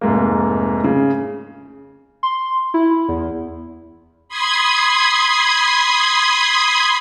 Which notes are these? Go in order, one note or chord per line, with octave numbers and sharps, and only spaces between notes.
F1 G#2 A#3
C#3
C6
E4
E2
B5 C6 D#6 G#6